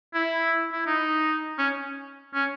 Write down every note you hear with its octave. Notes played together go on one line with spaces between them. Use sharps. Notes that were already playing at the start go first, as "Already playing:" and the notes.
E4
E4
D#4
C#4
C#4